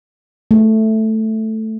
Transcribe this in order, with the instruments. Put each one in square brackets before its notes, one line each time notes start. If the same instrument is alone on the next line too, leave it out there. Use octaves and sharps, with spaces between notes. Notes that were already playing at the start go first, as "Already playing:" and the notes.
[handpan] A3